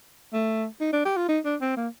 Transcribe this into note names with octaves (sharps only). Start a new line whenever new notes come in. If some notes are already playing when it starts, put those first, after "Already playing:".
A3
D#4
D4
G4
F4
D#4
D4
C4
A#3